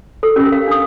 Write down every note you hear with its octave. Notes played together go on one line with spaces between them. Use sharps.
A4
C#4 G4 A#4
F5
D4 D#6